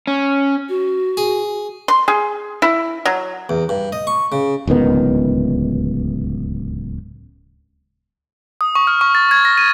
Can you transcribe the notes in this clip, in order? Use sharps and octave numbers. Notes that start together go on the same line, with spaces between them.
C#4
F#4
G#4
C6
G#4
E4
F#3
E2
G2
D#5
C#6
C#3
D1 C#2 D#3 B3
D#6
C#6
F6
C#6
A6
G#6
A#6
D#7